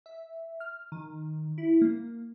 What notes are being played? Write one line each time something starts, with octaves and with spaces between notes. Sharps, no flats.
E5
F6
D#3
E4
A#3